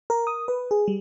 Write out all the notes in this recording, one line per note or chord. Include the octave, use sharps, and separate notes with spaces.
A#4
D#6
B4
G#4
G3